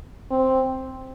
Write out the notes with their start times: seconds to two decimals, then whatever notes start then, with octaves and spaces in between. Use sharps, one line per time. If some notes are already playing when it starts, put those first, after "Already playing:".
0.31 C4